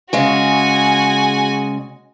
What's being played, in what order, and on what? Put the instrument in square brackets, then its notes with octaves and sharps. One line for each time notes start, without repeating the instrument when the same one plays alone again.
[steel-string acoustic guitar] C#3 G#3 [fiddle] F#4 G#5